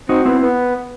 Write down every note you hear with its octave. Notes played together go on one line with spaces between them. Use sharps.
C4 D#4 F#4
B3 C4 E4
B3